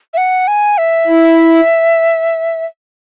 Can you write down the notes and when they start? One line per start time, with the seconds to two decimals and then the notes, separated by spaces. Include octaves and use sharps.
0.14 E5
0.17 F#5
0.47 G#5
0.78 E5
1.07 E4